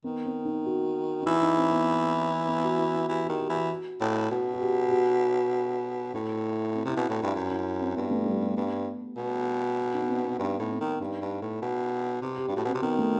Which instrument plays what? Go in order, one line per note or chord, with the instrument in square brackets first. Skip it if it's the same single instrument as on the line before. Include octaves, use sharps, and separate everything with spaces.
[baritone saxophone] D#3 [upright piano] B3
[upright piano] C4
D#4
F#4
D#4
[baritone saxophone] E3 [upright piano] E4
[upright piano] D#4
C4
B3
B3
F#4
E4
E4
[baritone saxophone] E3 [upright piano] G4
[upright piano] G4
[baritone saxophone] D#3
[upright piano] G4
[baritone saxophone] E3
[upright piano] F#4
[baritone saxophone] A2
[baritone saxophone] B2 [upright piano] F#4
[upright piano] F#4
G4
G4
F#4
[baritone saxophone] A2 [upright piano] E4
[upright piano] C4
[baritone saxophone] C3 [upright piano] E4
[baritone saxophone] B2
[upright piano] F#4
[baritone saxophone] A2
[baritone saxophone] G2 [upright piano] G4
[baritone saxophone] F#2 [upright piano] F#4
[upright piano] E4
C4
[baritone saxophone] G2 [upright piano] B3
[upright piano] A3
G3
B3
[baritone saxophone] G2
B2
[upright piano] D#4
B3
C4
B3
[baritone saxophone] G2 [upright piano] D#4
[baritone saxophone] A2 [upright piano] B3
[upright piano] C4
[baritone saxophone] D#3
[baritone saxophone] G2 [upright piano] D#4
[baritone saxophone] G2
A2
B2
C3
[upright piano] G4
[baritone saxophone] G2
[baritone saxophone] A2 [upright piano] F#4
[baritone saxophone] B2 [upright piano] C4
[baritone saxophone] C3
[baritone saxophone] D#3 [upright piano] B3
[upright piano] A3